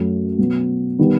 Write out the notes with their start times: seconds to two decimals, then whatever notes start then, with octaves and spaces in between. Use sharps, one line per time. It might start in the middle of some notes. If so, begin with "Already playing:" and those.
Already playing: F#2 F#3 A3
0.38 B2 F#3 B3
0.99 D#3 G3 B3